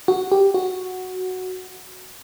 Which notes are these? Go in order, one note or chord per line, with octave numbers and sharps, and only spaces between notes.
F#4
G4
F#4